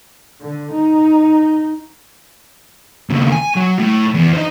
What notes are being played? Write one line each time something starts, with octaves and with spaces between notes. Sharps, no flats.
D3
D#4
D#2 C#3
G#5
F#3
A2
E2
C4 D#4